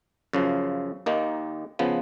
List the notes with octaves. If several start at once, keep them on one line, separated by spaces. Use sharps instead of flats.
F#2 C#3 F3
D#2 D#3 A#3 D#4
C#3 F3 B3